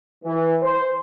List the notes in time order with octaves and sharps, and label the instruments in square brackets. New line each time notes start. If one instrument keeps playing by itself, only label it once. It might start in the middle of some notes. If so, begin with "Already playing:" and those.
[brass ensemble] E3
C5